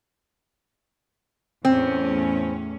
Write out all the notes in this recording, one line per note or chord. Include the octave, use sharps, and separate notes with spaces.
E2 A2 C4 C#4